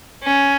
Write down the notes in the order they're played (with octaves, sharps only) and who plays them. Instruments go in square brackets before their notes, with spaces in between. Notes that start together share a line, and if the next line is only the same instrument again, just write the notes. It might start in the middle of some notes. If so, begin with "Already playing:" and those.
[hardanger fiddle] C#4